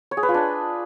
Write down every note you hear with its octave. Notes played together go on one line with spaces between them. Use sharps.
C#5
G#4
B4
F4
D4